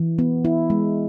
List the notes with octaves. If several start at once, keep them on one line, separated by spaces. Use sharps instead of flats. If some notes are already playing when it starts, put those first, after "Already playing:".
Already playing: E3
B3
E4
G#3